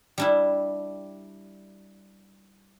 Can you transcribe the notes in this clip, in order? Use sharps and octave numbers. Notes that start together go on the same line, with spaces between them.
G3 D4 E4